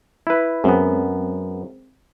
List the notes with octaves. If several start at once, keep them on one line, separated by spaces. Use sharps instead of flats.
E4 B4
F#2 G#3 B3 C4